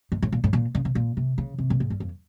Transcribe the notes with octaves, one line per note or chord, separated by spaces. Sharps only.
G#2
A2
A#2
A2
A#2
C#3
C3
A#2
C3
C#3
C3
A2
G#2
G2
F2